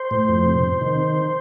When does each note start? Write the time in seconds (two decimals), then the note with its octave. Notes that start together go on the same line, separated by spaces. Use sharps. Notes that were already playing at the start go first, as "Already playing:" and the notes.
Already playing: C5
0.11 A2
0.28 F2
0.46 C3
0.64 C3
0.81 D#3